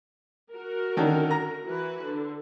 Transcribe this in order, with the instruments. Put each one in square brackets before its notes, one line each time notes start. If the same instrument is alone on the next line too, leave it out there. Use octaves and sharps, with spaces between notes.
[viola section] F#4 A#4
[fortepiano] D3 D#3 C#4
A#5
[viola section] E3 F#4 B4
D3